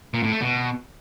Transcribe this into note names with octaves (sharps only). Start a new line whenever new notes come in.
A#2
A2
A3
B2